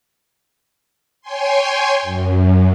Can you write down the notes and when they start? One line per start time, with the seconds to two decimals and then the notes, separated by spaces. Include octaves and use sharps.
1.21 C#5 G5 G#5 C6
2.02 F#2